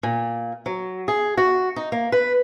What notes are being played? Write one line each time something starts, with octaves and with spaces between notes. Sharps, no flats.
A#2
F#3
G#4
F#4
D#4
A#3
B4